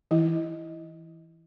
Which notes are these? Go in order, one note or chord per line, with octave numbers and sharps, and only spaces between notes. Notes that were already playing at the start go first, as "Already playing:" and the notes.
E3 E4